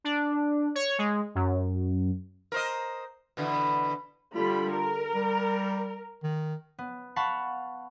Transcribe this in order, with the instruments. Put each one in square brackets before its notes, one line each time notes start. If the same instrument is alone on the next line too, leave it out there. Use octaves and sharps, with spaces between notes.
[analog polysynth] D4
C#5
G#3
F#2
[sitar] A#4 C5 D#5
B2 D3 E3
[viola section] D3 G3 B5 [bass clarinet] F4
[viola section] A#4
[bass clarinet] G3
D#3
[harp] B3
F5 F#5 A5 B5 C#6